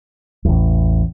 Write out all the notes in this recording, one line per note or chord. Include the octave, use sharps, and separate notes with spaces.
A1 E2